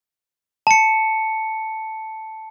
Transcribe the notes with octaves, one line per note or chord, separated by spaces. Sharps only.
A5 C#7